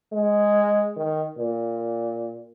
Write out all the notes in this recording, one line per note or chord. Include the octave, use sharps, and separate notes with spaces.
G#3
D#3
A#2